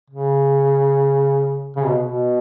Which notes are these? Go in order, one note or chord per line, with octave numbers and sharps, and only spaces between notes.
C#3
C#3
B2
B2